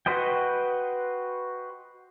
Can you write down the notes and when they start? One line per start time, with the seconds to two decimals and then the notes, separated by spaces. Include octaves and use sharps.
0.06 F#4 B4 C5 D#5 G5